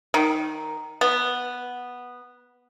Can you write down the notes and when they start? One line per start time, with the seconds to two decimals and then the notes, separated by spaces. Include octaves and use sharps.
0.14 D#3
1.01 B3